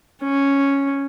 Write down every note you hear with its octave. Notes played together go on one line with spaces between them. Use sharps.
C#4